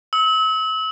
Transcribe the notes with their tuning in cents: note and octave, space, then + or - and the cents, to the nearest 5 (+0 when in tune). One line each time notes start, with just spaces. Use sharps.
E6 -40